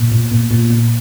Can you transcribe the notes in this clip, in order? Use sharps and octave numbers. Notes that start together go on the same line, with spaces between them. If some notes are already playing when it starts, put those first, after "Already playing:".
Already playing: A#2
A#2
A#2
A#2
A#2